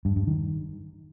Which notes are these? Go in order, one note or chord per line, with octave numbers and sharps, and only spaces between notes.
G2
G2
D#3